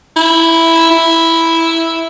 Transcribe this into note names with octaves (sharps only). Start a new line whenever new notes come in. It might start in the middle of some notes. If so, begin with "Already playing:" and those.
E4
E4